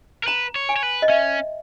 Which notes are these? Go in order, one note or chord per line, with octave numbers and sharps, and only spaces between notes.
A#4
B4 A#5
C#5
G#5
C#5
B4
D#5
C#4 E5